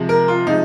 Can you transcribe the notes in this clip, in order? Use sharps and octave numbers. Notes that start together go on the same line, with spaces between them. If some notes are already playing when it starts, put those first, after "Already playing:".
Already playing: C3 F3 G#3
A#4
F4
C3 F3 G#3 D#4